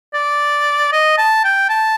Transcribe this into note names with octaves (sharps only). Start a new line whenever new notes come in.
D5
D#5
A5
G5
A5